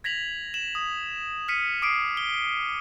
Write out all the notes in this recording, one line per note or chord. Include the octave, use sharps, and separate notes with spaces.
G#6 A#6 B6 F7 F#7
E7 F#7
D#6
F6 B6 C#7 D#7
D6 D#6 C7 D7
G7